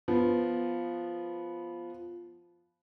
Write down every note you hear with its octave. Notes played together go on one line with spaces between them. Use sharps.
F3 B3